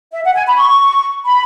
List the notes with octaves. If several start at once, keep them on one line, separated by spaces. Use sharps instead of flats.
E5
F#5
G#5
B5
C#6
B5